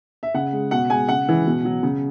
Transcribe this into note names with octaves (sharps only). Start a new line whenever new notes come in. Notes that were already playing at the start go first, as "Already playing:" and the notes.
E5
C#3 F#5
G#3
B2 F#5
G#3 G#5
C#3 F#5
E3 G#3
B2
F#3
C#3